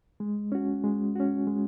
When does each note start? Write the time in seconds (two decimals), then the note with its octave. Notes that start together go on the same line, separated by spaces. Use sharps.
0.20 G#3
0.52 C#4 F#4
0.84 G#3
1.15 C#4 F#4
1.47 G#3